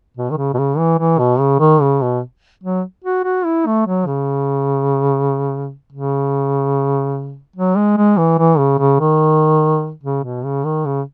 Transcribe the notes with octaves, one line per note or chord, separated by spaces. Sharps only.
B2
D#3
C#3
B2
C#3
E3
E3
B2
C#3
D#3
C#3
B2
F#3
F#4
F#4
E4
A3
F#3
C#3
C#3
F#3
G#3
G#3
E3
E3
C#3
C#3
D#3
C#3
B2
C#3
D#3
C#3